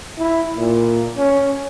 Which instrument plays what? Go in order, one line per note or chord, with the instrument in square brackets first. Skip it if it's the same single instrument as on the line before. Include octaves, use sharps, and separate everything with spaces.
[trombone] E4
A#2
C#4